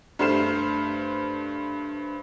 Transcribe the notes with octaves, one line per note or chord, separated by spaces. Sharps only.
G2 A3 C5 F6 C7 E7